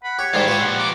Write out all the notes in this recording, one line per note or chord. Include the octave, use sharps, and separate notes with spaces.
F#5 B5
G4 C#5
G#2 D#3 G3 E4 F4
A2 F4 G4 B4
A#2 F3 F#5
D6